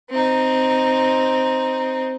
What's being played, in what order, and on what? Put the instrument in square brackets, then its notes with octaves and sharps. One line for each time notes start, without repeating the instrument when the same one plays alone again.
[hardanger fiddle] C4 D#4